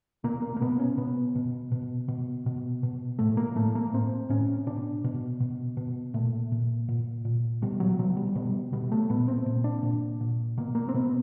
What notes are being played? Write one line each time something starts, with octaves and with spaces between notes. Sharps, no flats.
B2 A#3
A#3
A#3
B2 B3
C#4
B2 B3
B2
B2
B2
B2
B2
A2 A3
A#3
A2 A3
A#3
A2 C4
A2 C#4
B2 D4
B2
B2
B2
A#2 A3
A#2
A#2
A#2
B2 G3
F#3
B2 F#3
G3
B2 G3
B2 G3
A3
A#2 B3
C4
A#2
D4
A#2
A#2
B2 A#3
A#3
C4
B2 B3